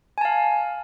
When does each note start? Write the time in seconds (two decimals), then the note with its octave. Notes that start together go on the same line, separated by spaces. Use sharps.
0.18 G#5
0.21 A5
0.25 F5